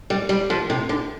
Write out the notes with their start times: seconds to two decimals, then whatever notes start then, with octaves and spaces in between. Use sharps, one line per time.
0.10 G3
0.29 G3
0.50 F3
0.70 C3
0.89 D3